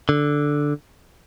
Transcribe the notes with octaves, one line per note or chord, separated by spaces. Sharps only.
D3